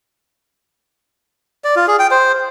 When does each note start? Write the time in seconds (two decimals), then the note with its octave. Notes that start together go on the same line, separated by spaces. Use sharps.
1.64 D5
1.76 F4
1.87 G#4
1.99 G5
2.11 C5